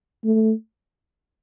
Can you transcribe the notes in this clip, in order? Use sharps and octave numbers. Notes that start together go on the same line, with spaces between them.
A3